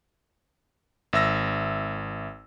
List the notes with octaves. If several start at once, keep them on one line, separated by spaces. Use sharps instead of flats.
G#1 E5 E6 A#6